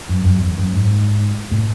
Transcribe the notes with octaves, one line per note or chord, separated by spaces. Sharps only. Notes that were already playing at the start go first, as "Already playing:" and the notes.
F#2
F#2
E2
F#2
G#2
A2